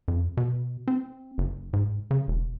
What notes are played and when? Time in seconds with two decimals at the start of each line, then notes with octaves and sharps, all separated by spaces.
0.08 F2
0.37 B2
0.87 C4
1.38 F#1
1.73 G#2
2.11 C#3
2.28 E1